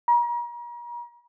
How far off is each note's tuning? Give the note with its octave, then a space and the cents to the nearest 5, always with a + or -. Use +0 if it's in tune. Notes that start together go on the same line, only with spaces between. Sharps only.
A#5 +40